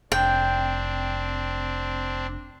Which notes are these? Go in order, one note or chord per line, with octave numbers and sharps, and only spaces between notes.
F1 C4 D4 G5